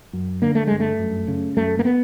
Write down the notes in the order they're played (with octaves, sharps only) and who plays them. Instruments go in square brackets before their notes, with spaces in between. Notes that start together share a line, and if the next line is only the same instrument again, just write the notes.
[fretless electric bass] F#2
D3 A#3
A3
G2 G#3
A3
F#2
C#3
F#2 A3
A#3
B3